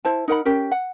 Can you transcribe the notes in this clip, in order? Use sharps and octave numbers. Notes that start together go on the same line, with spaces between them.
E4 C5 A5
D#4 A#4 F#5 B5
C#4 G4 A#4
F#5